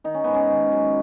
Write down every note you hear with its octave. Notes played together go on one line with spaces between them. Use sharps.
D#3 D#4
C#4
G#2 B3
C#4
D#3
F#3